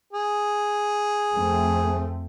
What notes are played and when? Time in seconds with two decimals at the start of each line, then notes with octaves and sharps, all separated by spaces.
0.13 G#4
1.32 F2 A3 C4